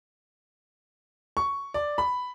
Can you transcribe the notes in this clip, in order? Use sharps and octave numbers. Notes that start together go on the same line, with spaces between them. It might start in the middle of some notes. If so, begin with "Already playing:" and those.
C#6
D5
B5